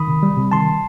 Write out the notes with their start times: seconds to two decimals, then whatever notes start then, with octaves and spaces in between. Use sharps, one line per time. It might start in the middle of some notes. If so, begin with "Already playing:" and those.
Already playing: D#3 B5 D#6
0.08 C3
0.23 G3
0.37 C3
0.52 D#3 A5 C6